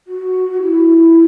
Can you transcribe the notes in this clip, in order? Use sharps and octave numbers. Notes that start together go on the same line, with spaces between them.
F#4
E4